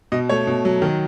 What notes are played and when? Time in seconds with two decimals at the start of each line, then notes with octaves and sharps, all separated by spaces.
0.12 B2 D#5
0.29 A3 C#5
0.47 B2
0.65 F#3
0.82 D#3